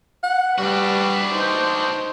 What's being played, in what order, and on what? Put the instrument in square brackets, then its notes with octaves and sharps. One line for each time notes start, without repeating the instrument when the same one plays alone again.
[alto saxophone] F#5
[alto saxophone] G3 [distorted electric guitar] D4 F#4 [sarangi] B4
[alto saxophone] D#4 [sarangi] C5